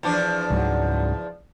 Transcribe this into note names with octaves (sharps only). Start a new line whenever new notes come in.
E2 F3 D4
C#2 G#2 F#3